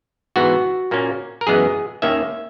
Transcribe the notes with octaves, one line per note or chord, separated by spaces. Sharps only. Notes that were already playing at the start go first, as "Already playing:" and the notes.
G#2 E3 B3 F#4
A#2 A#3 C#4
A#4
F#2 E3 G#3 B3 G#4
D#2 D#3 A#3 C#4 E5